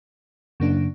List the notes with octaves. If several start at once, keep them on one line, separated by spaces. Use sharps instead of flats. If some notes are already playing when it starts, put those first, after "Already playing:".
F#2 C#3 F#3 A#3 D4